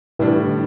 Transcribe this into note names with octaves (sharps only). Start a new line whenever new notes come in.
A2 E3 G3 D4
D3